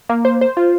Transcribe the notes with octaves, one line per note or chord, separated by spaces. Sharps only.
A#3
C5
C5
F4